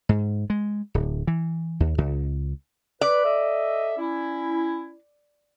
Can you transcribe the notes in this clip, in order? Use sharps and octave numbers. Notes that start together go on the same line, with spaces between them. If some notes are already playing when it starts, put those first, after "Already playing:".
G#2
G#3
D1
E3
D#2
C#2
B4 D5
A4 D#5 E5
C#4 E4